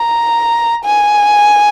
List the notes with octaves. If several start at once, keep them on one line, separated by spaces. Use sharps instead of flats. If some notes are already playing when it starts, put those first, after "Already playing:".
Already playing: A#5
G#5